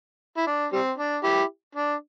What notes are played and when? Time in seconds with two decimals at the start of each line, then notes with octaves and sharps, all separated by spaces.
0.38 E4
0.47 D4
0.73 G3 C4
0.98 D4
1.23 E4 G4
1.75 D4